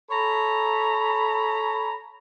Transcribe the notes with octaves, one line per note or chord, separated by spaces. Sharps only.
A4 C#5 A#5 B5